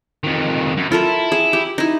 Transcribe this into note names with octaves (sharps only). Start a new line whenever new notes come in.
F2 D#3
F#2
E4 F4 A4 A#4
G#4
G4
D#4 E4